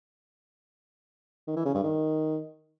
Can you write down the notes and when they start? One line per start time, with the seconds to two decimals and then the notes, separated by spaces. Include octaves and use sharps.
1.47 D#3
1.57 E3
1.66 C#3
1.75 G2
1.84 D#3